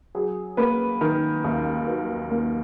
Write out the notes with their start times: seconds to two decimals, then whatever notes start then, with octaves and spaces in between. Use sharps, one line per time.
0.15 F#3 G#4
0.57 A#3 B4
1.01 D#3 A#4
1.44 D#2
1.87 F#3 B4
2.31 A#3